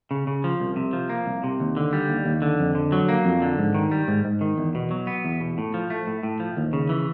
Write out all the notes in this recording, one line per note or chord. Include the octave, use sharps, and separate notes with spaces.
C#3
C#3
F3
C2
C3
F3
A#3
C2
C3
D#2
D3
G3
D#2
D#2
D3
F2
D3
F#3
A#3
F2
D3
G#2
D#3
G3
G#2
G#2
D#3
E2
B2
F#3
B3
E2
B2
A2
F3
A3
A2
A2
F3
D#2
C#3
E3